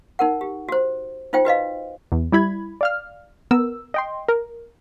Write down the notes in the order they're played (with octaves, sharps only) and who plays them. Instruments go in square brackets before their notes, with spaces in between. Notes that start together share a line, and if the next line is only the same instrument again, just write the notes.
[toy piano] D#4 A#4 F#5
G4
F#4 C5
D#4 F4 C5 G5
F#4 B4 D#5 F5
[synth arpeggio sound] E2
G3 E4 B5 G#6
D5 F5 F6
B3 A#4 E6
D#5 G5 C6
A#4